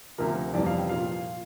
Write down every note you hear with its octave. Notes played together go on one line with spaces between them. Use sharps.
D2 C3 F3 A#4
F2 C3 E3 G3 D5
F5
G5
A#2 F3 F5